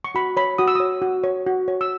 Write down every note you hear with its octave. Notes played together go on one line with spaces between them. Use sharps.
C#6
F#4 B5
C#5 B5
F#4 D#6
E6
C#5 D#6
F#4
C#5
F#4
C#5
E6